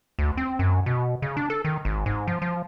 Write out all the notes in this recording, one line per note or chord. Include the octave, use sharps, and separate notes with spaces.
D2
C4
F#2
B2
C#3
D4
A4
D#3
G#1
G#2
F3
F3